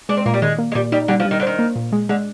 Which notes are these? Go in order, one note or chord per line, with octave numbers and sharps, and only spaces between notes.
G#3 D4
C4
A#2 A#3
G3
D#3 G#3
A#3
G#3
A#2 G3
G3 D#4
D3 G3
F3
G3
D#3
D3
D#3 C5
A#3
A#2
G#3
D3 G#3